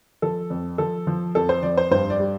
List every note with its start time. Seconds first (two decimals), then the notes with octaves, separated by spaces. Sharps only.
0.22 F3 A4
0.50 F2
0.78 F3 A4
1.07 F3
1.35 F2 A4
1.49 C5
1.63 F2 D5
1.77 C5
1.91 G2 C5
2.10 D5
2.19 G3